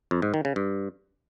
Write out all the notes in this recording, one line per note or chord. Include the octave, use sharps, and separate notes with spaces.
F2
G#2
D#3
C#3
G2